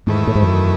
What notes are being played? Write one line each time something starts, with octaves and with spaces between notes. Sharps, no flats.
E2 G#2 D#3 A3 E4 B4
A2
G#2
F#2